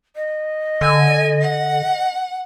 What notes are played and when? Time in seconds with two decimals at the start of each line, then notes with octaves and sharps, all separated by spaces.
0.16 D#5
0.81 D3 G#5
1.41 F#5